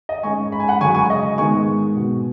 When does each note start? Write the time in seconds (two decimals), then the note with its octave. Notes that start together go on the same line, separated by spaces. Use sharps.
0.09 D#5
0.23 G#2 G#3 C#4 G#5 C#6
0.52 B5
0.60 G#5
0.68 F#5 B5
0.81 F#2 C#3 G#3 G#5 C#6
0.95 G#5 C#6
1.10 D#5
1.38 G#2 D#3 G#3 B3 G#5 C#6
1.97 B2 B3